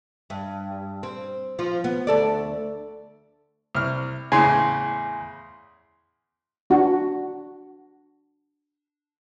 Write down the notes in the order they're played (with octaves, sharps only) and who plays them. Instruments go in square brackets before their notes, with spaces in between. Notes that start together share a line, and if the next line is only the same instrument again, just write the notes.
[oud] G2
C4
F3 F4
B3
D2 A4 D5
[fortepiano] C2 F6
[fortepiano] E2 A2 C#3 [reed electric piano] G#5 C6
[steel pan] D4 F#4